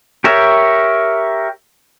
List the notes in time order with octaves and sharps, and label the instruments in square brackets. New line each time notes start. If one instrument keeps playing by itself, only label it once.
[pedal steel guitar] G4 A#4 C#5 E5